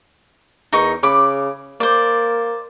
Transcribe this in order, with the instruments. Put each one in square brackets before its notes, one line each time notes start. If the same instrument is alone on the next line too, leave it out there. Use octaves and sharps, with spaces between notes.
[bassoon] E2 [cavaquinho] D#4 A#4 C#6
[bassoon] C#3 [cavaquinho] B5 D6
[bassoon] A#3 [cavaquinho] C5 D5